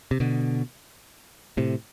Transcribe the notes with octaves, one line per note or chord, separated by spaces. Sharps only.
C3
B2 D3
A2 C3